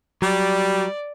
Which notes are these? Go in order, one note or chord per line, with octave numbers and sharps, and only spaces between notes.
F#3 G3 D5